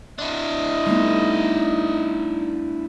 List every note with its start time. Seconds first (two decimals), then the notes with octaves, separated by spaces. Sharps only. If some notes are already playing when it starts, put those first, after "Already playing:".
0.19 D4 E4 D#5
0.87 G3 A3 B3 D#4